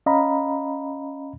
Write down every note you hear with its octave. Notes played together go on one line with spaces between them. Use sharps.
C#4 D#5 F5 A#5 B5